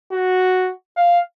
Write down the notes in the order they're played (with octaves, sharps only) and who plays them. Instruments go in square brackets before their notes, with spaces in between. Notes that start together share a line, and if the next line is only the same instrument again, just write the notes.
[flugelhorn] F#4
F5